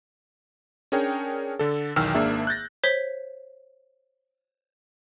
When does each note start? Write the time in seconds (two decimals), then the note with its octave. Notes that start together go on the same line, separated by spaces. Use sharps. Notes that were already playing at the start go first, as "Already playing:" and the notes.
0.92 C#4 D4 G#4 A#4 C#5 G5
1.59 D3 A4
1.96 B1 E2 D#3 G5 E6 F6
2.15 G#1 A#3 D4 G#4 E5
2.47 F#6 G6 A6 A#6
2.84 C5 C#5 B6 G7